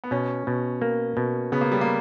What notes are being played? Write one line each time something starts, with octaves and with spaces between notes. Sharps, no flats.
B3
B2 C#4
B2
A#3
B2
C#3 B3
A#3
G3
A#3